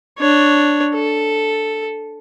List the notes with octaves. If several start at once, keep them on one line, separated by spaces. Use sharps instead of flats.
D4 C#5
A4